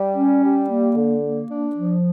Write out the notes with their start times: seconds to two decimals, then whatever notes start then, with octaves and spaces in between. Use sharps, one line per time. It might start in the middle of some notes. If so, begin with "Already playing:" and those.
Already playing: G3
0.16 C#4
0.43 G3
0.69 A#3
0.96 D3
1.23 A#3
1.49 D4
1.76 F3